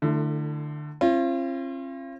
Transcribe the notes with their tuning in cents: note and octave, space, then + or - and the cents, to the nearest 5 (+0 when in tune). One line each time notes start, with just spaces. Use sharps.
D3 +25 A3 +0 E4 +30
C4 +45 F4 -40